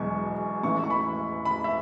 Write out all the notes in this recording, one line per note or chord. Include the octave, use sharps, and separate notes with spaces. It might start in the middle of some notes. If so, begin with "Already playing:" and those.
Already playing: E1 E2 B2 F#3 C#6
A1 A2 E3 C#6
C#6
B5
B5
E5